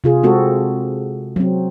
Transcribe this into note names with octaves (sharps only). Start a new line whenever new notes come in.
C3 F4 G#4
G#3 C4 F#4 A4
F#3 C4